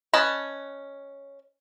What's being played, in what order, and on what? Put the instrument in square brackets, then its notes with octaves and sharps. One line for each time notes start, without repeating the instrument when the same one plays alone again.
[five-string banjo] C#4 B4 D#5 A5